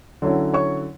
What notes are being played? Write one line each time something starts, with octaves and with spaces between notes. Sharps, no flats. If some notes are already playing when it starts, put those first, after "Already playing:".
D3 F#3 C#4 E4
C#5 C#6